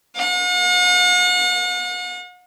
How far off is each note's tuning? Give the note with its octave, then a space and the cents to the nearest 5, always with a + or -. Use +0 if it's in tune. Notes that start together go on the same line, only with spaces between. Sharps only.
F#5 -45